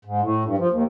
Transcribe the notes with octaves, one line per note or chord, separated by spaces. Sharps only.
G#2
A2
G2
F3
D#2